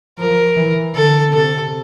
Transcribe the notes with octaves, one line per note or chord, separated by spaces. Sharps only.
F3 A#4
E3
D3 A4
C3 A4